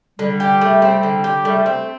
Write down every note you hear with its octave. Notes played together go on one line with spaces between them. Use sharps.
D3 G3
G4
A3
C4
D3
G4
G3 A3
C4